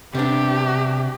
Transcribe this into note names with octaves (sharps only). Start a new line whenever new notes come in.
C3 G3 B3 D4 G4